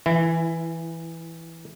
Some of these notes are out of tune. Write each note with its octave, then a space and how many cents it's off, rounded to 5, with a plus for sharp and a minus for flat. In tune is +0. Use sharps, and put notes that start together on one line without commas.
E3 +0 E4 +25